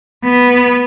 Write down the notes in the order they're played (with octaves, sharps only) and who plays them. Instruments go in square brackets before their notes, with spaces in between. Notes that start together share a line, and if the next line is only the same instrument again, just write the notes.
[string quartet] B3